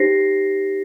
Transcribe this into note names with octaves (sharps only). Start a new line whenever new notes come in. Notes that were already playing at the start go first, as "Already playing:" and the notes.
Already playing: D#4 G4 C5 A#6 C7